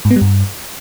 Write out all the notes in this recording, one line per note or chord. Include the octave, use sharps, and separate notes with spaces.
G#2
B3
G3
G2